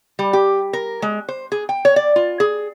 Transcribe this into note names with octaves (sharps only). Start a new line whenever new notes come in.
G3
G4
A#4
G#3
C5
G#4
G5
C#5
D5
F4
G#4